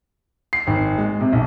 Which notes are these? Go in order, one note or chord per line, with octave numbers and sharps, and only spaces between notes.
C7
G#1
G#3
C3
B1